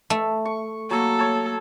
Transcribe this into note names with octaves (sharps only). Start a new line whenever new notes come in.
A3
C#6
F#3 A#3 A4
C#5 A5